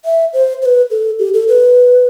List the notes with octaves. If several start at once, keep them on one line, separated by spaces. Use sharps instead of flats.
E5
C5
C5
B4
A4
G4
A4
B4